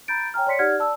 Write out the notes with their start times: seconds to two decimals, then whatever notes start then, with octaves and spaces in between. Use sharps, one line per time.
0.08 A#5 B5 G6 A6 D7
0.34 C#5 G5 G#5 A#5 F6
0.47 C#5 D5 C6 B6 C#7
0.59 D#4 G4 D5 F#5 F6 G#6
0.79 D5 A5 E6